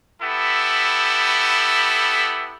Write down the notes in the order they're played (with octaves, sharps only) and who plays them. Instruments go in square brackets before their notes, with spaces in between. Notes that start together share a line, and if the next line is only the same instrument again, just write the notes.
[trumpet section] B3 E4 G4 A4